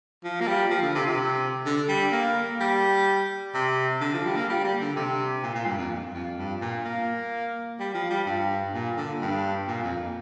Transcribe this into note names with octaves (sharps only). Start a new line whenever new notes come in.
F3
A#3
G3
F3
D3
C3
C3
D3
G3
A#3
G3
C3
D3
F3
G3
A#3
G3
G3
D3
C3
A#2
A#2
G2
F2
F2
G2
A#2
A#3
G3
F3
G3
G2
A#2
D3
G2
A#2
F2